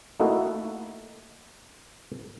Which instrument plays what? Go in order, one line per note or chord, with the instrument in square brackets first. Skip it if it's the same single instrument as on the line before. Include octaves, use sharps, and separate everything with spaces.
[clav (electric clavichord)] A3 A#3 D#4 E4 F#4 A4